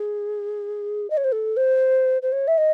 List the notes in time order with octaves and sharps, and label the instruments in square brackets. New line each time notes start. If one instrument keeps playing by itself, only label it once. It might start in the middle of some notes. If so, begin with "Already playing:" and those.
Already playing: [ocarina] G#4
D#5
C#5
C5
A4
C5
C5
C#5
E5
D#5